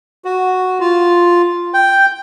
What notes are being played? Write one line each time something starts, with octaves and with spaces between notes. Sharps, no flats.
F#4
F4
G5